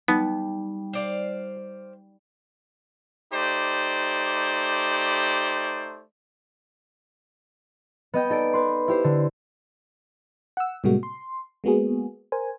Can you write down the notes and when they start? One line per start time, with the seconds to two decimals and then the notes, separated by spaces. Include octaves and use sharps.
0.08 G3 B3 D#4
0.93 C5 D5 F5
3.33 A3 D#4 G4 C5 D5
8.14 B3 D#5 G5
8.30 D#4 A4 D5 D7
8.53 B4 C6
8.88 E4 G4 C5
9.04 D3
10.57 F#5 E6
10.84 A2 C3 G3 G#3 A#3 F#4
11.03 C6
11.64 G#3 A#3 B3 F#4 G#4
12.32 A#4 C5 G#5